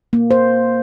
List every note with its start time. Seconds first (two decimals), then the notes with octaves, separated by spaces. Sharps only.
0.13 A#3
0.31 C5